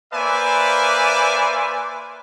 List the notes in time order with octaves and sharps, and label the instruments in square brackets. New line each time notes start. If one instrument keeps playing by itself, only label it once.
[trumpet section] A#3 B4 C5 D5 E5 G#5